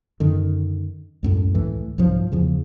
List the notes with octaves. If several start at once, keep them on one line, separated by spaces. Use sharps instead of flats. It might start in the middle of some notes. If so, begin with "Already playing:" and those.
F#2 D3 D#3
C#2 F#2 A2
C#2 A2 E3
C2 G#2 F3 F#3
E2 C#3 F3